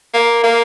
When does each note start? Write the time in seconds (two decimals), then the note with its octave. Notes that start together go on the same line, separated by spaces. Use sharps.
0.14 A#3
0.44 A#3